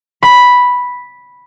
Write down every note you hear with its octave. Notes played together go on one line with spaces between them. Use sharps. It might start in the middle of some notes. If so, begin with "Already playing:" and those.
B5